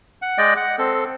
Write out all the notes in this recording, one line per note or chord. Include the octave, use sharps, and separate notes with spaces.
F#5
G#3 D5 D#5 G5 F#6
F#5
C4 A4